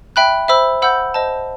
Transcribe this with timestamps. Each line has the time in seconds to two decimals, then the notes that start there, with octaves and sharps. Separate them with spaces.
0.16 E5 G5 B5 F#6
0.48 C5 E5 B5 E6
0.82 C5 F#5 B5 E6 G6
1.14 C5 D#5 A5